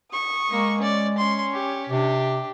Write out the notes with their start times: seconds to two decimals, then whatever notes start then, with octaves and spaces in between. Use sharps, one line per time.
0.11 C#6 D#6
0.50 G#3 A#3
0.82 C#4 D5
1.18 C#4 C6
1.53 G4
1.89 C3 D4 G4